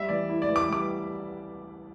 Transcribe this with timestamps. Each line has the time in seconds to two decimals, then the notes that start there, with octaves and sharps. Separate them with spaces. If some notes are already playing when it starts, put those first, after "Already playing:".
Already playing: G3 E5
0.09 E3 D5
0.29 E4
0.42 D5
0.49 E3
0.56 D6
0.69 G3 D6